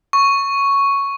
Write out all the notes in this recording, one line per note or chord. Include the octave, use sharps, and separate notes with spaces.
C#6